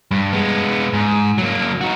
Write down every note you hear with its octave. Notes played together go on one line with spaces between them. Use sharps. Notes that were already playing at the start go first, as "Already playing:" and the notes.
G2
G#3 B3
G#2
F#3 A#3
D#4 F#4